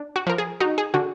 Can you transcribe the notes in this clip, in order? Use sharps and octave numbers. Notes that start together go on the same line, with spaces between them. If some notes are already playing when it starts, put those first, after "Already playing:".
Already playing: D4
F#4
F3 A#4
G#4
D#4 F#4
G#4
D3 F#4